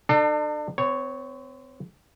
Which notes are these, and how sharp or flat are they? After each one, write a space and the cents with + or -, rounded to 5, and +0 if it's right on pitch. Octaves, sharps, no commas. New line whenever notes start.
D4 +40 A4 +20
C4 -40 C#5 +0